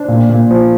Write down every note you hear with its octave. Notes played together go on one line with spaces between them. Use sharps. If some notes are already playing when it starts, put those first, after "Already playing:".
Already playing: D4 C5
A#2
A#2
F3